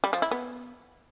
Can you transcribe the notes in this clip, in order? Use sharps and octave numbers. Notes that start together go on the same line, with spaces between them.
G3
F3
E4
B3